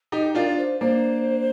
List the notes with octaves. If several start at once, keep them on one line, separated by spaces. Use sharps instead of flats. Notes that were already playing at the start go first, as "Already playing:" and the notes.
D#4 G4 D#5
D4 F4 A#4
D5
C5
A#3 D4 C5